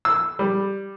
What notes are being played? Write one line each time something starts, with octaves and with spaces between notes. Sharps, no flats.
E6
G3